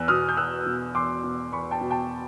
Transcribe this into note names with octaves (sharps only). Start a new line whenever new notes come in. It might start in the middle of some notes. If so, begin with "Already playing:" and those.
Already playing: E2 E6 F#6
B2 D#6 F6
G6
E2 E6 F#6
B2
E2 C6 D6
B2
E2 B5 C#6
G5 A5
B2
G5 A5